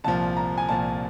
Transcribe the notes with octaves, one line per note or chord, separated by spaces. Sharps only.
C2 A#2 F3 A5
A#5
G#5
C2 A#2 F3 A5